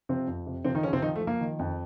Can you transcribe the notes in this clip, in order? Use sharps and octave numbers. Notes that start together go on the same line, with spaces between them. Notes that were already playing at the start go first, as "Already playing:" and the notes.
C3 F3 C4
F2
C3
C3 F3 C4
D#3 D#4
C#3 F3 C#4
C3 C4
D#3 F3 D#4
A3
F3
A#3
D#3
F2